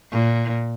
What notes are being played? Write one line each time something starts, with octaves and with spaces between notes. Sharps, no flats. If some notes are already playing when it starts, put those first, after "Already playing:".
A#2